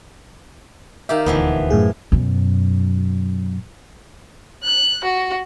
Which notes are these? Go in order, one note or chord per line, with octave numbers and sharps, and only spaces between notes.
D#3 G4 E5 F5
D#1 D2 E3 F3 B3
F#2 A2 G#4
F#2 B2
F#6
F#4